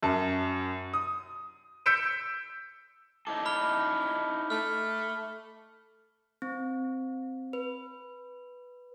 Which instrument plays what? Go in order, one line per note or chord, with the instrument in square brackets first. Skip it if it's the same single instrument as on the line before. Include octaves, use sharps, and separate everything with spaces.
[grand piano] F#2 A5
D#6
E6 G6 B6 C#7 D7 E7
[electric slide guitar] D#4 E4 A4 [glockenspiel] D6
[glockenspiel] B5 F6 G7
[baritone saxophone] A3 [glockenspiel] F6
[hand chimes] C4
B4